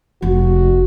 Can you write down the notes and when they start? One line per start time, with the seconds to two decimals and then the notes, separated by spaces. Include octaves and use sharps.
0.22 F1 F2 F#4